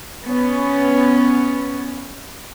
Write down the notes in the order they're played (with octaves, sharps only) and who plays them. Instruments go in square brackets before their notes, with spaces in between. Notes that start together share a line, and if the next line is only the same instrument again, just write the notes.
[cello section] B3 C#4